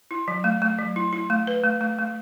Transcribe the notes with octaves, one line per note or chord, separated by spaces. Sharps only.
E4
F#3
A3
A3
F#3
E4
E4
A3
B4
A3
A3
A3